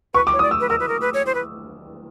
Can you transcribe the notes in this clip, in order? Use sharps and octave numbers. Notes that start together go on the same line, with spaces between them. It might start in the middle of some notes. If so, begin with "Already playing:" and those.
B4 C#6
D6
C#5
D#6
D5
E6
B4
A#4 E6
B4
A#4
B4
C#5
C5
B4